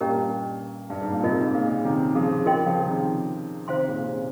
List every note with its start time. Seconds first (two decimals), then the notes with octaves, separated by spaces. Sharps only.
0.01 G2 A#2 C#4 G4 A#4 D#5 A#5
0.90 G2
1.02 G#2
1.12 A#2
1.23 G#2 C3 F4 A#4 D#5
1.54 A#2 C#3
1.85 C3 D#3
2.15 C#3 F3
2.46 F4 A#4 D#5 G5 C6
2.66 C#3 F3
2.86 C3 D#3
3.68 C3 D#3 C5 F5 C6
3.88 A#2 C#3
4.09 C3